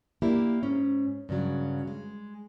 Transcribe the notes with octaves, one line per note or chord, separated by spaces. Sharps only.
A#3 D4 E4 G4
G#2 C#4
G2 C#3 F#3
G#3